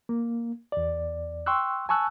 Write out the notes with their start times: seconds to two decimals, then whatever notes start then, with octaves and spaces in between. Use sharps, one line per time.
0.09 A#3
0.72 E2 D5
1.46 G5 C6 C#6 E6 F#6
1.89 G#5 A5 C#6 E6 F#6